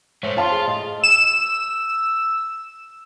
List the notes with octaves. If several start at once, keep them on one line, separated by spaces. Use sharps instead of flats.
G#2 A3 C5 C#5
F4 F5 A5 C6
G#4
A2 D#5
E6 E7